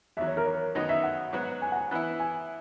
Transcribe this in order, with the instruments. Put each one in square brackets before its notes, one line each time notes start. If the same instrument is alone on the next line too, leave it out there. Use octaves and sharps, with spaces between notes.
[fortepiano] E2 D#3 F#3 [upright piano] E5
[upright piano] C#5
A#4
C#5
[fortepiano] F#2 D#3 F#3 B3 D#4 [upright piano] D#5
[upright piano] E5
F#5
[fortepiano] G#2 F#3 B3 F#4
[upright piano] G#5
F#5
G#5
[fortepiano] E3 B3 E4
[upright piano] G#5